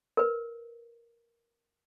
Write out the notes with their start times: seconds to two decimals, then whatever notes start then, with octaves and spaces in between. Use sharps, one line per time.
0.17 A#4 B4